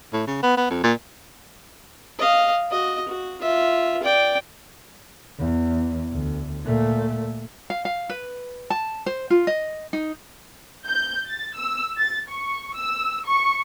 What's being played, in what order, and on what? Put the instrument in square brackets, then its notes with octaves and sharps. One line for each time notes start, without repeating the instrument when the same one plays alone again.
[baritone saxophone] A2
C#3
B3
B3
F2
A#2
[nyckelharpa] D#5 F5
F#4 D#5
F#4
F4 E5
D5 G5
[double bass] E2
D2
A#2 A3
[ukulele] F5
F5
B4
A5
C5
F4
D#5
D#4
[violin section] G6
A6
E6
A6
C#6
E6
C#6